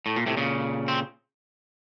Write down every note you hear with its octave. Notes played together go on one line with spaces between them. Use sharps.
A2
A#2
A2 C3
A#2 C#3
C4